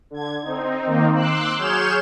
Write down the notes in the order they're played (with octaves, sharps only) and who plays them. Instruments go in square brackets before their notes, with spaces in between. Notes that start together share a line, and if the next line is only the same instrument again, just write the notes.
[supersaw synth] D3 G#6
C4 D#4
D#3 A#3 C4 D#4
C6 D6 E6 F#6
F#3 G#4 C#5 F6 G6 E7